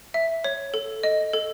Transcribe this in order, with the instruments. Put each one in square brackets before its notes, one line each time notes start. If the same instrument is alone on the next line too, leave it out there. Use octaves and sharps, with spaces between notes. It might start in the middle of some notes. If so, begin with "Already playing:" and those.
[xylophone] E5
C#5
A4
D#5
A4